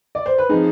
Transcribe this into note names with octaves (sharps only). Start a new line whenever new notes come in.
D5
C5
B4
F3 C4 D#4 G#4